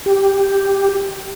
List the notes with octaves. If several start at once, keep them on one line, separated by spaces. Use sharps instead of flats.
G4